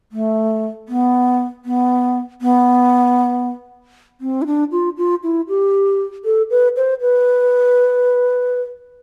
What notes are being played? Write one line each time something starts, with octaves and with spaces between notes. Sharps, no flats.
A3
B3
B3
B3
C4
E4
D4
F4
F4
E4
G4
A4
B4
C5
B4